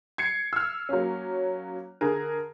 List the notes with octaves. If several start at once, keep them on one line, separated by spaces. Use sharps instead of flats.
G#6 C7 C#7
E6 F6
F#3 A#3 C#4
D3 G#4 A#4